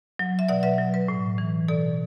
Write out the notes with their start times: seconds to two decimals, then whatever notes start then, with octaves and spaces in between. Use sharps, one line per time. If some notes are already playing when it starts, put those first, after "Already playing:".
0.19 F#3
0.39 E5
0.49 B2 D5 F#5
0.63 B4 E5
0.79 F#3
0.94 B4
1.08 A2
1.38 E3
1.68 B2 A4 D5